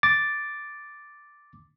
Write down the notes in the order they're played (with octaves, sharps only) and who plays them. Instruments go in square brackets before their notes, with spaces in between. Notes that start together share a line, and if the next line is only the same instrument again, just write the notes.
[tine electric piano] D6 A6